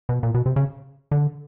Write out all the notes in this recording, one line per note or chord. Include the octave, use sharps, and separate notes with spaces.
B2
A#2
B2
C3
C#3
D3